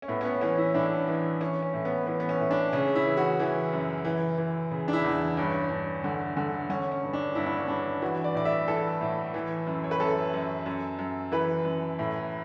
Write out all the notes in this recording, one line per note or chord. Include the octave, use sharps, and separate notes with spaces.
C#4
A2 B3
C#4
B3
E3 C#4
E4
A2 D4
E3
E3 C#4
C#4
A2
B3
E3 B3
B3
C#4
A2
D4
C#3 C#4
E4
E3
F#4
E3
F#2
E3
E3
C#3
D4
E4
E2
G2 C#4
G2
D3
D3
D3 C#4
C#4
G2
D4
G2 E4
D4
C#4
G2 D4
E3 F#4
D5
A2 D5
E5
E3 A4
A2
E3
F#2
C#5
B4
F#2 A4
F#2
F#2
F#2
E3 B4
F#2
A2